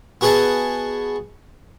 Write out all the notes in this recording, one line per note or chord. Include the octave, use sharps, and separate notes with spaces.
B3 F#4 G#4 D#5 F#5 A5